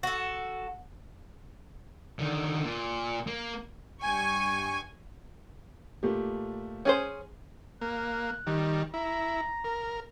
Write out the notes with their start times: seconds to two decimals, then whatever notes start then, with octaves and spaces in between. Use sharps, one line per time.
0.03 F#4 A4
2.19 D3 D#3
2.65 A#2
3.27 A#3
4.02 G2 G5 G#5 C#6
6.03 A#2 A3 G4
6.85 C#4 G#4 C5
7.81 A#3 F#6
8.47 D#3 G3
8.94 E4 A#5
9.64 A#4